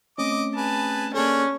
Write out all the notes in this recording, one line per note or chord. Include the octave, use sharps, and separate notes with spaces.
A3 C4 C#4 D#5 D6
G#4 B4 A5
A#3 C#4 D4 G#4 A4 C#5